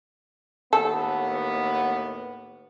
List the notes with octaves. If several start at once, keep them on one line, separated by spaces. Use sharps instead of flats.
D#2 A2 B3 A4